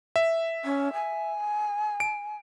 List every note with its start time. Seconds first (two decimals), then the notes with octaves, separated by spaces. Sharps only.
0.16 E5
0.65 C#4
0.93 G#5
2.00 D7